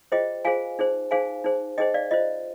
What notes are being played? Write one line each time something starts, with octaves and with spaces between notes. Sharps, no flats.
F4 G#4 C5 D#5 G5
F4 G#4 C5 F5 G#5
D#4 G#4 C5
D#4 G#4 C5 F5 G#5
D#4 G#4 C5
D#4 G#4 C5 D#5 G5
D5 F5
F4 C5 D#5